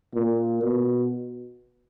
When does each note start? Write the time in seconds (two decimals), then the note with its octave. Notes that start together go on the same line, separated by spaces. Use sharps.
0.15 A#2
0.63 B2